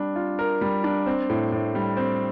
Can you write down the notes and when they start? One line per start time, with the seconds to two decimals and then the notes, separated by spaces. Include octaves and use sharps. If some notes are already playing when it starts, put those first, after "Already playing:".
Already playing: G3 D4
0.16 F4
0.39 A#4
0.61 G3
0.84 D4
1.06 C4
1.30 A2
1.52 A2
1.75 G3
1.97 C4